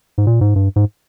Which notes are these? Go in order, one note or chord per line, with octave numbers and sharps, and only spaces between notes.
G#2
A#2
G#2
G2
G#2